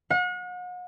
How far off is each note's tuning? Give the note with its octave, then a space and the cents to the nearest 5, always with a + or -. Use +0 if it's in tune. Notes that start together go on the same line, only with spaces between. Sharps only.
F#5 -40